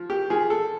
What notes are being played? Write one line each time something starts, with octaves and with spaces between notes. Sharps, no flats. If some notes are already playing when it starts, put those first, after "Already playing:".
Already playing: F3
G4
F3 G#4
A4